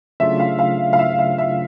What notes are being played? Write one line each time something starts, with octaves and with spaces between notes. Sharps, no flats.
C#3 F#3 A3 D4 F4 E5
F5
F5
F5
E5
E5
E5